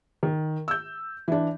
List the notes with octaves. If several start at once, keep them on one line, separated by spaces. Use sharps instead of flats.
D#3
E6 G6
E3 D4